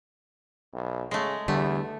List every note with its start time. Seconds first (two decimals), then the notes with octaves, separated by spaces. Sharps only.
0.73 B1
1.11 C#3 G#3 A3
1.48 E2 D3 G3 A3